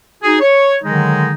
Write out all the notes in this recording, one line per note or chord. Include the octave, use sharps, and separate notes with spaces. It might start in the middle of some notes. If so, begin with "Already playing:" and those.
D#4 F#4 G#4
C#5
D3 D#3 F#3 G#3 D#4